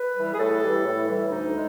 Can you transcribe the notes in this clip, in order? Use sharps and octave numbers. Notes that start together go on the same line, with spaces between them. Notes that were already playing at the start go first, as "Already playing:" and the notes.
Already playing: B4
E3 G3
G#4
A2 A4
E3 G3
A2
E3 G3
D2 D#4
G#3